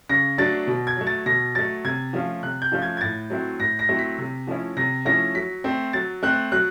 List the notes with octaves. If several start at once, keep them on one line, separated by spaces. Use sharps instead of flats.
C#3 A#6
F#3 A3 D4 A6
B2
G#6
F#3 A3
A6
B2 A#6
F#3 A3 A6
C3 G#6
F3 A3 C#4 F4
C3 F#6
G6
F3 A3 C#4 F4
G#6
G#6
A2 A6
F#3 A3 C4 E4
A2 A#6
A#6
F#3 A3 C4 E4
B6
C3
F3 A3 C#4 E4
C3 A#6
F3 A3 C#4 E4 A#6
F#3 B6
A3 C4
F#3 A6
A3 C4 F#6
F#3 F#6